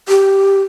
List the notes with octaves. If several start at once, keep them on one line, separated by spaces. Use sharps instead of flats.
G4